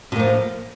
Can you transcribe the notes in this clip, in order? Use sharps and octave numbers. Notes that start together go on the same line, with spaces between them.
A2 F3 A#3